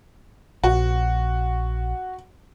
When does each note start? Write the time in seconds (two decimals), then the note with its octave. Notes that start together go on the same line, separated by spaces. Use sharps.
0.64 A#1 F#4